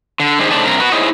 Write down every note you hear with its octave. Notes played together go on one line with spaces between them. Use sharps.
D3
G#2 D#3 D4 G#4 C5
C#3 A3 D#4 C5 D5 A5
G2 C3 A#4
F#4 B4
D#4 E4 G#4 C5 C#5 D#5